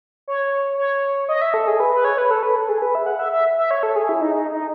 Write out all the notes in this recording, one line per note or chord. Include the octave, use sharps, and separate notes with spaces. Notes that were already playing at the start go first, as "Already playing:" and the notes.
C#5
C#5
D#5
E5
A4
G#4
B4
B4
C#5
B4
A4
B4
A4
G#4
B4
E5
F#5
E5
E5
E5
C#5
A4
G#4
E4
D#4
D#4
D#4